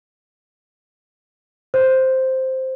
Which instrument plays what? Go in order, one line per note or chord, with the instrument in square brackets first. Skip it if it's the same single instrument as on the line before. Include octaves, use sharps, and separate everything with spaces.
[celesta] C5